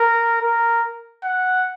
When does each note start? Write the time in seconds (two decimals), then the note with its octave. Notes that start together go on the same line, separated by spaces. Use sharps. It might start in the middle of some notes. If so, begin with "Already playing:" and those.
Already playing: A#4
0.42 A#4
1.24 F#5